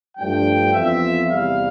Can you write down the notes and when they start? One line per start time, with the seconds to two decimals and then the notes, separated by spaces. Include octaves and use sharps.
0.17 G2 F3 A3 D4 G5
0.73 F2 E3 B3 F4 E5
1.28 E2 C3 G3 F5